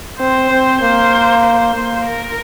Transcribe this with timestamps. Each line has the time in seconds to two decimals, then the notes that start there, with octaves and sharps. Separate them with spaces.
0.20 C4 C5
0.51 C4
0.82 A#3 C5
1.44 C5
1.74 A#3
2.05 A#4